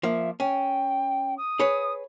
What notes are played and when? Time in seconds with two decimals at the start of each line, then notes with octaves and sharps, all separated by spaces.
0.03 F3 A#3 E5
0.40 C#4 G5
1.38 D#6
1.60 G#4 B4 C#5